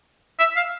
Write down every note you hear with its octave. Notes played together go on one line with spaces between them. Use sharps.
E5
F5